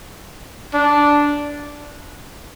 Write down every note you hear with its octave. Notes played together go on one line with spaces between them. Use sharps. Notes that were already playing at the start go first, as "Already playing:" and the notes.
D4